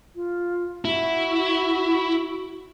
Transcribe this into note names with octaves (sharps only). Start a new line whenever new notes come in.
F4
E4 F#4